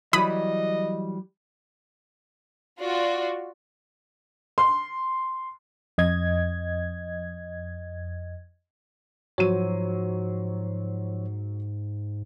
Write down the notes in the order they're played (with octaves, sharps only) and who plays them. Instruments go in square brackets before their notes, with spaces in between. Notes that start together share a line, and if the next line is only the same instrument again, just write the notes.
[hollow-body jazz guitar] E3 F#3 G3 [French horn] D#5 [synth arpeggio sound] B5 D#6
[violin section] F4 F#4 D5
[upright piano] C6
[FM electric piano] F2 D#5 G#6
[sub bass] G#2 [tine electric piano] F3 C5 C#5 [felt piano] F#3 D#7